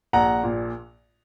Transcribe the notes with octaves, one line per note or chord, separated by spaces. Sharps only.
A#1 F#5 A#5
A#2